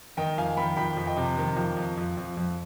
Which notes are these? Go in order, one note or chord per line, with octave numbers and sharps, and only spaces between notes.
D#3 D#5 G5
F2 F5 G#5
D#3 G5 B5
F2 G5 B5
F2
D#5 G5
C3
D#3
F2
F2
F2
F2
F2